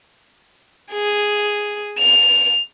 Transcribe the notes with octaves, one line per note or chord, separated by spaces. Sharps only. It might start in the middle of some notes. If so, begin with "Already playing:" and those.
G#4
F7